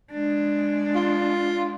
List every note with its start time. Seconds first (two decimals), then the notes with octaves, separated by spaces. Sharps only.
0.13 G#3 D4
0.95 F4